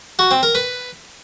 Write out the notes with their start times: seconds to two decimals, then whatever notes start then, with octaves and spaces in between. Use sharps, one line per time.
0.19 F#4
0.31 C4
0.43 A#4
0.55 B4